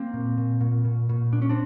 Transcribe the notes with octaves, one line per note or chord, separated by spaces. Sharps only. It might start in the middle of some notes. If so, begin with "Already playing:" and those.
Already playing: A#3 C4
A#2
A#2
A#2
A#2
A#2
A#2 D4
C#4
C4 D4